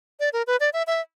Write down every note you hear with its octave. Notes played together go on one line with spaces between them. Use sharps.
D5
A#4
B4
D5
E5
E5